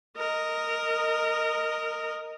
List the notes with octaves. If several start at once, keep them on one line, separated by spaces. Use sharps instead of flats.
A#4 D#5